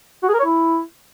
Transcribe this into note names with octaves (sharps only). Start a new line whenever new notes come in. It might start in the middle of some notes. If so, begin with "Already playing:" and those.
F#4
G#4
A#4
C#5
E4